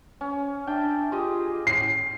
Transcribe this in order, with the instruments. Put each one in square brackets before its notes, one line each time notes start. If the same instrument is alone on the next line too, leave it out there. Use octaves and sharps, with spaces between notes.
[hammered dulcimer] C#4
[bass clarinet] D4 [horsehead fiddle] E5 [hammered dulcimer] G5
[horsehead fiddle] F4 G#4 [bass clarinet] G4 [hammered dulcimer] D#5 C6
[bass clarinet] A2 [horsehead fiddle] C#4 [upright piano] C7